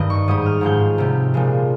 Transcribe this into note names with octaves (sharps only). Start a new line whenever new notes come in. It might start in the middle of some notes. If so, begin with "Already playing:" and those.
Already playing: G2 D#3 G3 D#5
C#6
G#2 G3 D#6
F6
G#2 F3 G#3 G6
C3 G3
A#2 F3 G#3